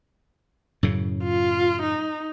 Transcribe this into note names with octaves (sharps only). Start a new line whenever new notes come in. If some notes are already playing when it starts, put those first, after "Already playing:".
F#2 A2 C#3
F4
D#4